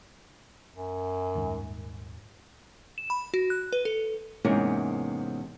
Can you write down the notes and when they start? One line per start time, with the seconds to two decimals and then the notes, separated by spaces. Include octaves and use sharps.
0.73 F#2
1.35 D#1 D#2 G#2
2.98 E7
3.10 B5
3.34 F#4
3.50 F#6
3.73 B4
3.85 A4
4.45 E2 G#2 C3 A#3 B3 C#4